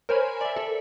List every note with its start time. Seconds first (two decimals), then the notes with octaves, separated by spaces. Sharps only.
0.09 A#4 C5 C#5 G#5 B5
0.41 D5 E5
0.56 A4